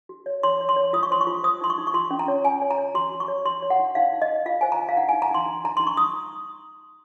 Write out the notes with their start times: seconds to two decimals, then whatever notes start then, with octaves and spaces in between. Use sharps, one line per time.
0.09 F#4
0.26 C#5
0.43 C#5 C6
0.61 C#5
0.69 C6
0.76 C#5
0.93 F4 D#6
1.03 C#6
1.11 C5 C6
1.21 C#6
1.27 F4
1.43 C5 D#6
1.61 D#4 C6
1.70 C#6
1.78 D#4
1.87 C#6
1.94 F4 C6
2.11 C#4
2.19 A#5
2.28 C#5
2.45 F4 G#5
2.62 C#5
2.71 A#5
2.78 C#5
2.95 F#4 C6
3.12 F#4
3.20 C#6
3.28 C#5
3.45 F#4 C6
3.62 C#5
3.70 F#5
3.79 D#4
3.95 D#4 F5
4.12 D#4
4.22 D#5
4.29 D#4
4.46 F4 F5
4.61 C5 G#5
4.72 A#5
4.79 C5
4.89 F5
4.97 D#4 F#5
5.09 D#4 G#5
5.22 A#5
5.31 D#4 C6
5.46 D#4
5.64 D#4 A#5
5.77 D#4 C6
5.87 C#6
5.97 D#4 D#6